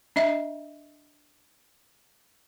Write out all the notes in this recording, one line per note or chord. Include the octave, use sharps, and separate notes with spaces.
D4 D#5 E5 A#5